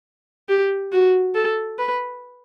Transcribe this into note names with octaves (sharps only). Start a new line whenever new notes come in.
G4
F#4
A4
B4